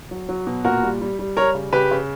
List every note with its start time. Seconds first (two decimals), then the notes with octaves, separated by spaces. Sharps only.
0.11 F#3
0.29 F#3
0.47 B2
0.65 A#2 F#4 A#4
0.83 G3
1.01 G3
1.19 G3
1.37 G3 A#4 C#5
1.55 C#3
1.73 C#3 G4 B4
1.91 C#3